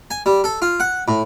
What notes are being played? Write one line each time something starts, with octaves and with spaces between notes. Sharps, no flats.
G#5
G3
A4
F4
F#5
A2